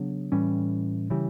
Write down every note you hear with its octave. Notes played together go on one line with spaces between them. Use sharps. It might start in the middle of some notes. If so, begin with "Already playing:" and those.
Already playing: C#3 F#3 B3 D4
A2 E3 G3 C#4
C#3 E3 G3